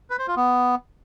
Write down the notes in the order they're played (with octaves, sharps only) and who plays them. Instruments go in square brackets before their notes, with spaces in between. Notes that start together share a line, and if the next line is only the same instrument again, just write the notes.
[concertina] B4
C5
F4
B3